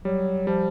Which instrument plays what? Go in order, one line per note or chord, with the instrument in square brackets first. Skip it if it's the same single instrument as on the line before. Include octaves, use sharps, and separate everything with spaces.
[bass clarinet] F#3 [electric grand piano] G3
[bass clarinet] F3 [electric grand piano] G3